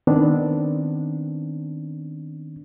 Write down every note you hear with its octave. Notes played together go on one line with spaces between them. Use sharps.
D#3 B3 C4 D4